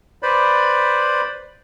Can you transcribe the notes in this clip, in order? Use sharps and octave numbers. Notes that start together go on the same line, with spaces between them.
B4 C5 D5 B5